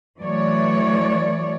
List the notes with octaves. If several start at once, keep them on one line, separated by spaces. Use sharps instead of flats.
E3 F#3 A3 C#5 D5